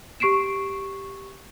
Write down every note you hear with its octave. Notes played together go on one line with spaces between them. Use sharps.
G4 C#6 C7 D7 E7